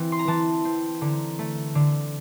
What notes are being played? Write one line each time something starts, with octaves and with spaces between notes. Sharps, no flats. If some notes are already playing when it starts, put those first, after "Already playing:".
Already playing: E3 C4
C6
A#5
E3 A5
C4
D3 A#5
A3
D3